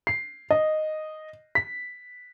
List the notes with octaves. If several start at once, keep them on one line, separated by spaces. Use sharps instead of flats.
C7
D#5
B6